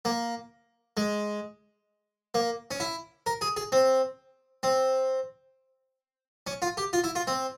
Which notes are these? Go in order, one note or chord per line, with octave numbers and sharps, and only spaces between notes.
A#3
G#3
A#3
C#4
E4
A#4
G#4
G#4
C4
C4
C#4
F4
G4
F4
E4
F4
C4